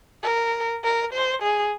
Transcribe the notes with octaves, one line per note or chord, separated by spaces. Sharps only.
A#4
A#4
C5
G#4